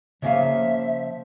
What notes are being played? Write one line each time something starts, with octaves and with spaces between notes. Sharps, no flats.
C#3 F3 A#3 E5 F5